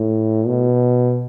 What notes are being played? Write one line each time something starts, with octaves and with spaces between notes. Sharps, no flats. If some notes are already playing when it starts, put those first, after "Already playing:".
Already playing: A2
B2